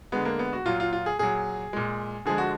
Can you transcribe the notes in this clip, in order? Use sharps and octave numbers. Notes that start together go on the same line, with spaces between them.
D3 G#3 B3
A#3
B3
F#4
A#2 F#3 F4
F4
F4
G#4
A#2 F#3 G#4
A#2 G#3
D3 F3 G#3 G#4
F#4